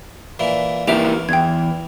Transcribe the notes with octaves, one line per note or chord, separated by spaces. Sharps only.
A#2 E3 E4
E3 A#3 E4 G4 E5 D6 F7
E2 G5 G#6